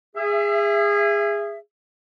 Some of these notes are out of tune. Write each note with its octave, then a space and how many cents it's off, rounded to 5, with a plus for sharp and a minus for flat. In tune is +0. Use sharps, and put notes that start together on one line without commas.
G#4 -20 E5 +25